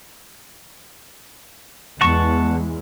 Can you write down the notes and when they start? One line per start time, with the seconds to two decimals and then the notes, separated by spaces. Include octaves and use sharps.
2.01 E2 E3 G#3 F#5 A5 C#6